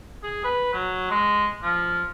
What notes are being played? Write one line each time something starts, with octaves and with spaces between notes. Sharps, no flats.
G#4
B4
F#3
G#3
F3